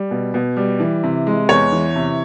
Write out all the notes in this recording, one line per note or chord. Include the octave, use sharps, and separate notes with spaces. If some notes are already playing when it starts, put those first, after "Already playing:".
Already playing: G3
B2
B2
G3
E3
C3
G#3
E2 C#5
E3
C3